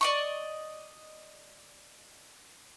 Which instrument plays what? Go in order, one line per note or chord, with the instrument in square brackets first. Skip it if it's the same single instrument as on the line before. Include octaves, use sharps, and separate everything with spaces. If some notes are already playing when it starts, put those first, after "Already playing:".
[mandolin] D5 D#5 C#6